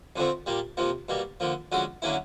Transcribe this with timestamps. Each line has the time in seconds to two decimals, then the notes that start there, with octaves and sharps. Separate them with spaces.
0.16 F2 D3 F3 A3 C4
0.46 A#2 G3 A#3
0.77 F2 C3 F3 A#3
1.09 B2 G3 A#3
1.40 D3 F3 A#3
1.72 D3 F3 G#3 C#4 F#4
2.02 D3 F#3 A#3 C#4 E4